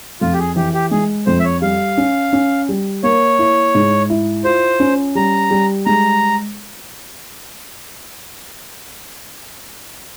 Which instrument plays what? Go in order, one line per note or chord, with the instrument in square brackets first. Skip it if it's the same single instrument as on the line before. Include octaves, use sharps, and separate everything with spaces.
[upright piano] F2 [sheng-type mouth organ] F4
[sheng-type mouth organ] G4
G#4
[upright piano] E3 [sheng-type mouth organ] G4
[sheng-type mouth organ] G4
[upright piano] G#3 [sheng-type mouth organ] G#4
[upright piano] F2 [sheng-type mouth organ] C5
[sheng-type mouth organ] E5
C#5
[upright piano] G3 [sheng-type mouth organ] F5
[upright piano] C#4
C#4
G3
[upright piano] A#3 [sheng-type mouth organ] C#5
[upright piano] E4
G#2
E4
[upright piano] F4 [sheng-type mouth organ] C5
[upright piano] C#4
[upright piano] G3 [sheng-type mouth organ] A#5
[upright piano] G3
[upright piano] G#3 [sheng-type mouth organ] A#5